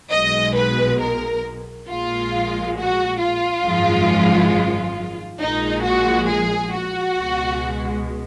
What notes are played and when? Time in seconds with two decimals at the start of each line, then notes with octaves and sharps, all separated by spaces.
0.11 B1 B2 G#3 D#5
0.55 B4
1.00 A#4
1.88 A#1 A#2 G#3 F4
2.76 F#4
3.19 F4
3.64 G#1 F#2 F3 G#3
5.40 A#1 A#2 F3 G#3 D#4
5.84 F#4
6.28 G#4
6.72 F#4
7.16 C#2 B2 G#3